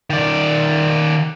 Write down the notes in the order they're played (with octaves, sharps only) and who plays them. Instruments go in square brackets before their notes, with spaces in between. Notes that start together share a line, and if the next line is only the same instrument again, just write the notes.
[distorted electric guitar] D#3 D5